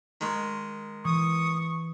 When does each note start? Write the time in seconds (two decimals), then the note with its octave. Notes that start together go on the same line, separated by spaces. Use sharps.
0.21 D#3 G#3
1.05 E3 C#6 D#6